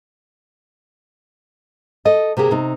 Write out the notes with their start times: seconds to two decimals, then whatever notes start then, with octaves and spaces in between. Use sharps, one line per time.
2.05 A4 D#5
2.37 C3 A#3 G4 G#4
2.51 C3 D#4